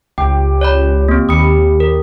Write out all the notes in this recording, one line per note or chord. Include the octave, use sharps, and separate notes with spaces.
C#2 G4 G5
C#5 D5 B5
A#3 C4
D#2 G3 D#6 C#7
A#4